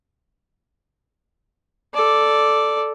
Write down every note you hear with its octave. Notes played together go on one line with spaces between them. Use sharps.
A4 D5